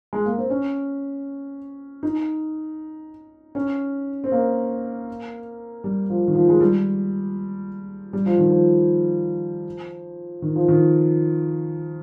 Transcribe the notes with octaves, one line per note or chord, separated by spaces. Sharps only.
G#3
A#3
C4
C#4
D#4
C#4
C4
A#3
G3
F3
D#3
F3
G#3
G3
G3
F3
D#3
F3
D#3
F3
D#3